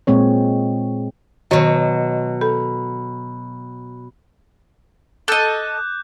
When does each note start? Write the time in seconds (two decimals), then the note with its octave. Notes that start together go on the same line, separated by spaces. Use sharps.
0.07 A#2 G#3 C4 C#5
1.51 B2 D#3 F#3 F#4 C#5 D#5
2.41 A4 B5
5.28 A4 D#5 D6 F#6 G6